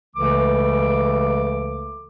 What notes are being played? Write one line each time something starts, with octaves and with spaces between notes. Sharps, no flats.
C#2 C#3 E3 A3 A4 D6